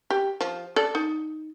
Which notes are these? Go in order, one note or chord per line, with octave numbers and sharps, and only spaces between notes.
G4
F3
A4 D5
D#4